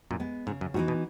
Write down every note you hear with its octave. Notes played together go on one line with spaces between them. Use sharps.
F#2 A#2
G#3 B3
G#2 C#3
F#2
G#2 E3 B3 D#4 F#4
B2